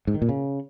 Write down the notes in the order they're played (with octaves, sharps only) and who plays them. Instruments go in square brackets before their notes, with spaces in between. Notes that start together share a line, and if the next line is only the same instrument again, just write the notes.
[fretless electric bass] G#2
D#3
A#2
C#3